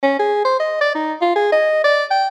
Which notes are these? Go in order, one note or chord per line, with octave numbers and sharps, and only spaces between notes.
C#4
G#4
C5
D#5
D5
D#4
F4
G#4
D#5
D5
G5